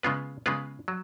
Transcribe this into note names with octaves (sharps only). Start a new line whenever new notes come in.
C#3 G#3 B3 F4 B4
C#3 G#3 B3 F4 B4
F#3